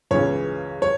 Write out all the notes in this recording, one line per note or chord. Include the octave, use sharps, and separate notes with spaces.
C#2 C#3 E3 C#5
C#5